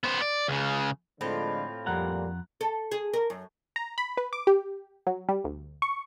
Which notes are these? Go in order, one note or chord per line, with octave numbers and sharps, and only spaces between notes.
B3 C5
D5
C#2 C#3
A2 D3 F3 G#3 C4 F4
F2 A#2 G3 F#5 A#5
A4
G#4
A#4
F#2
A#5
B5
B4
D6
G4
F#3
G3
D2
C#6